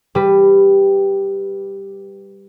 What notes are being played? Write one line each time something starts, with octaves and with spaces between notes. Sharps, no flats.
G3 B4